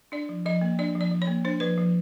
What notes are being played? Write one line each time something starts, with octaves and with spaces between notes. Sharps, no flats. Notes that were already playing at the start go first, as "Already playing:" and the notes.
D4 D5
F3
F3 D#5
A#3
D4 D5
F3
D5
F3
C#5
A#3
D4 C5
F3 B4
F3